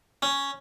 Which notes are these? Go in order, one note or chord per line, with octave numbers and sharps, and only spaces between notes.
C#4